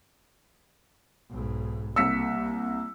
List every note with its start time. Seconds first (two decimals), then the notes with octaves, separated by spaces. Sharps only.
1.30 B1 G#2
1.96 C2 G3 A#3 E6 B6 C#7